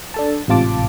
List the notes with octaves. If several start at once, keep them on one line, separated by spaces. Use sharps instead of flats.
D4 A4 A5
A1 G#2 C3 F4 A5 D6